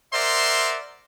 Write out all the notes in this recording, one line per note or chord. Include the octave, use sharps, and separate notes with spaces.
A#4 C5 D5 E5 F#5 C6